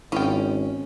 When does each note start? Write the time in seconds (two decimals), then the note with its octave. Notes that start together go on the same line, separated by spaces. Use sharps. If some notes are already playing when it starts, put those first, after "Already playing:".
0.12 G#1 C#4 E4 F4 G5